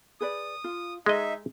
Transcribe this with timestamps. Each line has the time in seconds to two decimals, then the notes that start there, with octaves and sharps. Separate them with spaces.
0.21 G#4 B4 D5 D#6
0.64 F4
1.06 G#3 D#4 G#4 D#5 E5